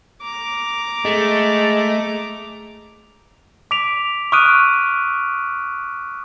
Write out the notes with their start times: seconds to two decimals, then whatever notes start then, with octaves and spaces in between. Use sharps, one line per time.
0.22 A#5 D6
1.05 G#3 A3
3.71 D6 B6 D7 F7
4.32 C#6 D#6 F6 F#6 D7 D#7